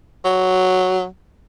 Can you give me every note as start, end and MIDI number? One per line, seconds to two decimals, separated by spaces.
0.25 1.05 54